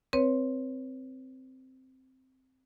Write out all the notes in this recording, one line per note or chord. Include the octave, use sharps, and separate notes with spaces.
C4 B4 C#5